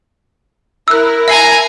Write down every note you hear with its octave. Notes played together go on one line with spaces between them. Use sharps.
E4 A#4 E6 F#6
E5 G#5 A#5 C7 F#7